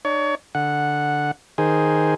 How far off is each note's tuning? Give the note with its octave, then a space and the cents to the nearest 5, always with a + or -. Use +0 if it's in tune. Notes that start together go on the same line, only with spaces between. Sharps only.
D4 +45 C#5 +30
D3 +0 F#5 -5
D#3 +0 G#4 +0 C5 +0